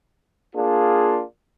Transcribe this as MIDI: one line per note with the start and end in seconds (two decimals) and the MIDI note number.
0.55 1.23 58
0.55 1.23 62
0.55 1.23 65
0.55 1.23 68